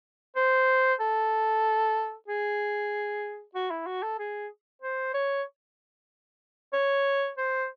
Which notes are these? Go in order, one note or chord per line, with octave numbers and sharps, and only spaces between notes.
C5
A4
G#4
F#4
E4
F#4
A4
G#4
C5
C#5
C#5
C5